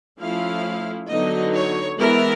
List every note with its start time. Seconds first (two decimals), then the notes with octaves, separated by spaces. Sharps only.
0.20 F3 A3 C#4 E4 F5
1.10 D3 F#3 B3 D#4 D#5
1.55 C#5
1.99 E3 G#3 B3 E4 A#4